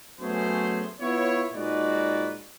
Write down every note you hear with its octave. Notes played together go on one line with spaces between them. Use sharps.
F#3 A3 B3 C#4 G#4 C5
B3 E4 F4 C#5
A#2 G#3 D#4 F#4 B4 D5